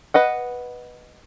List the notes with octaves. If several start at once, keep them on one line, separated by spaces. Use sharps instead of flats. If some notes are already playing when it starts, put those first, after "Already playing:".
B4 D#5 F#5